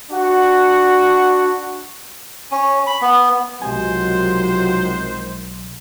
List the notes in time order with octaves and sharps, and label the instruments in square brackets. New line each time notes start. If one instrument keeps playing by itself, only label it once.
[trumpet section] D4 F#4 F#5
[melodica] C#4
B5
B3
[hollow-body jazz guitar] B1 G#5 [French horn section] C3 F3 F#3 [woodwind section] D#3 G#3 [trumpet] C5